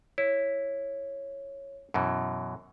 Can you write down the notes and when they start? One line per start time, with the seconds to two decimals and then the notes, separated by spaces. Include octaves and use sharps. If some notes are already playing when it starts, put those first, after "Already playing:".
0.18 E4 C#5
1.94 F#2 B2 E3